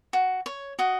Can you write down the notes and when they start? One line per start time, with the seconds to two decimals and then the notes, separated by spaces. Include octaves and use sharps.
0.13 F#4
0.46 C#5
0.79 F#4 D#5